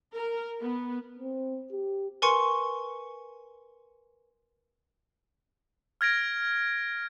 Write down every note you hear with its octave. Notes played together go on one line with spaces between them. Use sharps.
A#4
B3
C4
G4
A#4 B4 G#5 C6 C#6 C#7
F6 G#6 A#6 D7